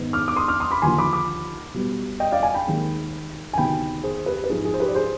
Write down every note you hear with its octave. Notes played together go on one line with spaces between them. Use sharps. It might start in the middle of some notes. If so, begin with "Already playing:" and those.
Already playing: G#2 D#3 B3 D#4
D6 F6
D6
C6 D#6
D6 F6
C6 D#6
B5 D6
D#2 D3 F3 G#5 C6
B5 D6
B5 D6
B2 G3 B3
D#5 G5
D5 F5
F5 G#5
G5 B5
D#2 D#3 G#3 C4
G#5
D2 C3 D#3 B3 D#4 G5 B5
G#4 C5
G4 B4
B4
G#2 F3 C4 D#4 G#4
G#4
C5
G4 B4
D5
G#4 C5